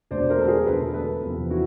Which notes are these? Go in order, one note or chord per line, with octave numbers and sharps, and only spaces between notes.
E1 D2 D3 C5 D5
A#4 C5
A4
G#4 A#4
E1 D2 D3 A4 B4
A4 B4
E2 C3 F3
E4 F#4